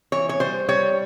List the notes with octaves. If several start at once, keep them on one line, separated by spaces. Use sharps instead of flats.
E3 C#5
C#5
G3 C5
G3 C#5